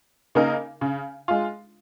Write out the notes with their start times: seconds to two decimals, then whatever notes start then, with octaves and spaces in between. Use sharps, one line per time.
0.35 C#3 A#3 D#4 A#4
0.81 C#3
1.28 G#3 F4